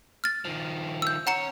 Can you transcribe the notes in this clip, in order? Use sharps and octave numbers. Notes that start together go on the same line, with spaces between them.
F6 A6
D#3 F3
E6 G6
C#4 C#5 F#5 A#5 C#7